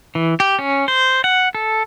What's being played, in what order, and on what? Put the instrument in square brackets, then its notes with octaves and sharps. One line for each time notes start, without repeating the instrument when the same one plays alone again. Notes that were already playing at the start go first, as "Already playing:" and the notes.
[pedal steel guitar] E3
G4
C#4
C5
F#5
A4